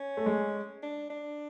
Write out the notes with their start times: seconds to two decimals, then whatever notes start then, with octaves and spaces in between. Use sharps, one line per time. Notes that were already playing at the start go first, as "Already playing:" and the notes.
Already playing: C#4
0.17 A3
0.26 G#3
0.83 D4
1.10 D4